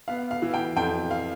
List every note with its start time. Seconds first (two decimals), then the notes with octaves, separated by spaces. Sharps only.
0.08 B3 F5
0.31 F5
0.42 E3
0.54 G5
0.76 F2 G5
1.11 F5